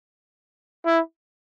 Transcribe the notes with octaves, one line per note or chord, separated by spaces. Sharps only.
E4